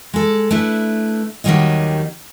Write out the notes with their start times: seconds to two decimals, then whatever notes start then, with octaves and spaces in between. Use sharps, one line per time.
0.13 G#3 A4
0.51 A3 D4 E4 B4 E5
1.44 D#2 D#3 F#3 G3 C#5 D#5